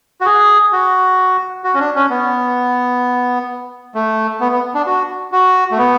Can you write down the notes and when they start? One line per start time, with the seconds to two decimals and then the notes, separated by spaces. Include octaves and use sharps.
0.21 F#4
0.26 G#4
0.72 F#4
1.64 F#4
1.74 C#4
1.79 D4
1.95 C#4
2.10 B3
3.95 A3
4.40 B3
4.52 B3
4.74 D4
4.87 F#4
5.32 F#4
5.71 A3
5.78 B3